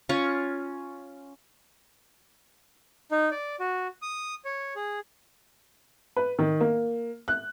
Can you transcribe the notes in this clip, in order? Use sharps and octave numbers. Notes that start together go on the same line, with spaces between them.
C#4 F4 C#6
D#4
D5
F#4
D#6
C#5
G#4
B4
D#3
A#3
F#6